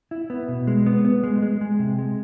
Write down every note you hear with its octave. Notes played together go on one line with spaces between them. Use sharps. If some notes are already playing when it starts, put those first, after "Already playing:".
E4
B3
B2
G#3
B3
B3
G#3
G#3
G#3
C3
G#3